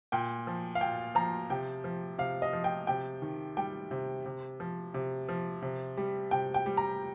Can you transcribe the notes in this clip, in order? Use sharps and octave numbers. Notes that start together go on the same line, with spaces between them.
A#2 G5
F3
F5
A#2 G5
F3 A#5
C3 G5
F3
C3 F5
D#5
F3
G5
C3 G5
D#3
G3 G5
C3
C3
F3
C3
F3
C3
G3
C3 G5
G5
G3
A#5